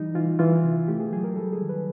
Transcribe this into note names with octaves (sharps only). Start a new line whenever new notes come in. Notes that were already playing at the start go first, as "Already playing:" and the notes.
Already playing: E3 G3 D#4
E3 F4
E3 F4
C3
A3 G4
G#4
F#3 G#4
A#4
G3 A4
G#4
D#3
B4